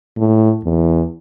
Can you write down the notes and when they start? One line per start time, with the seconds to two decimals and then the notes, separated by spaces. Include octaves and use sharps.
0.17 A2
0.64 E2